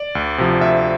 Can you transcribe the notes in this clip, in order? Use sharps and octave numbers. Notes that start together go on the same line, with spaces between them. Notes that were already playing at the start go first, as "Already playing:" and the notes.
Already playing: D5
D2
C3 F3
D2 E5